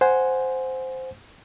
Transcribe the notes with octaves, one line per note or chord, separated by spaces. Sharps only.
C5 F#5 G#5